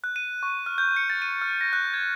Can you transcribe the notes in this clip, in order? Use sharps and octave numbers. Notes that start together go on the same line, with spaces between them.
F#6
D#7
C#6
F6
G6
C#7
A6
D#7
F6
A#6
F#6
G#6